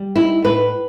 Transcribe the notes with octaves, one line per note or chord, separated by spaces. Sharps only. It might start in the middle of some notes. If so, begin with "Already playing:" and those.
Already playing: G3
D#4 E4
A2 B4